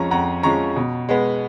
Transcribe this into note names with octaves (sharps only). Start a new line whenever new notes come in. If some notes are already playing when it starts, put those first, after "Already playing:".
Already playing: F2 F3 G#3 C#4 A#5 C#6
F2 F#5 A#5
F3 G#3 C#4 A#5 C#6
B2
G#3 B3